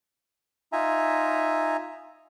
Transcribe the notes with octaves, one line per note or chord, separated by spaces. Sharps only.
D#4 F4 E5 G#5 A#5